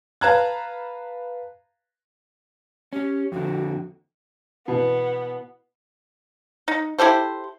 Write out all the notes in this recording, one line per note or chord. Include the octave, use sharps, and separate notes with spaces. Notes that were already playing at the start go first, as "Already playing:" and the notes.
B4 F5 A5 A#5 F#6 G#6
C#4 G4
F2 D3 F#4
B2 E3 B3
D#4
E4 G4 A4 C5